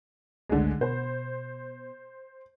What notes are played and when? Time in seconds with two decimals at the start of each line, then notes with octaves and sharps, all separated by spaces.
0.50 G#1 C#2 D3 G#3 A3
0.81 B2 C5